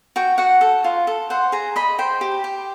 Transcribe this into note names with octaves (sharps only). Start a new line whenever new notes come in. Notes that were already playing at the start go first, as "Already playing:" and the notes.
F#4 G5
F#4 F#5
A4
F4
A4
C5 F#5
G#4 A#5
D#5 B5
C5 G5
G4
G4